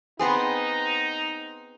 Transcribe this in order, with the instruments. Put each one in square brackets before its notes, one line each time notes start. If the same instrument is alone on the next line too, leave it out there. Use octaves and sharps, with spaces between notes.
[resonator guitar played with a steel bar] B3 C4 G#4 [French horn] D#4